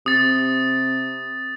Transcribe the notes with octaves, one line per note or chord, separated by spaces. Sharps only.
C3 D#6 A6